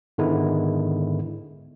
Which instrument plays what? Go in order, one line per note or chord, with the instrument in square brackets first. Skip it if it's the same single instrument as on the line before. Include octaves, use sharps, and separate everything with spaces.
[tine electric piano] G#2 D3 D#3 G#3 B3 E4